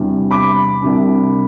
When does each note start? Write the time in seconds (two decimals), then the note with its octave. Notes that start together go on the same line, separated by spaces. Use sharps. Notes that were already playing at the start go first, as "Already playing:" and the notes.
Already playing: E2 C3 G3 D4
0.31 B5 D6
0.82 C2 C3 G3 D4